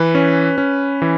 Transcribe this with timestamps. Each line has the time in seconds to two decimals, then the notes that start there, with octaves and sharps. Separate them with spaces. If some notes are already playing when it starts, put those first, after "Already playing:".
Already playing: E3 B4
0.15 C#4
0.58 C#4
1.02 E3